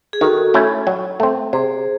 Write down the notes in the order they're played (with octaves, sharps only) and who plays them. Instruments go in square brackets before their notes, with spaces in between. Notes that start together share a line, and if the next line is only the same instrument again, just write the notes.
[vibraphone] G#4
[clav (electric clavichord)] D#3 [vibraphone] F#4 A4
[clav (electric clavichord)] A3 C#4 E4
F#3
A3 C4
[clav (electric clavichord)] C3 [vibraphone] G#4 C5